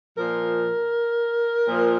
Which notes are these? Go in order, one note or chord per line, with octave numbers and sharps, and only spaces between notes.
A#2 F3 A#4
A#2 F3